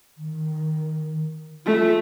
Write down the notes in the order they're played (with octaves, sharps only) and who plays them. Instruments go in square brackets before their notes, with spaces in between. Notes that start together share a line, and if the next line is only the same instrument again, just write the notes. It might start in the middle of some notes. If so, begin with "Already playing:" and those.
[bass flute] D#3
[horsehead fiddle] A3 [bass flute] F4